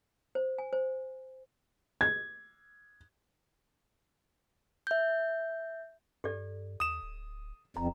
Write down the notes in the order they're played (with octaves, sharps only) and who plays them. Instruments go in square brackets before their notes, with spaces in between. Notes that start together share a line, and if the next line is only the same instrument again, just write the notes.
[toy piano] C5
G#5
C5
[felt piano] G#6
[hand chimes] E5 G6
[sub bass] G2 [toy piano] G4 A4 D5
[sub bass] D#2 [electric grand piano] D#6 E7
[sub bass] D1
[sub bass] D1 [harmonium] F2 [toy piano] A#5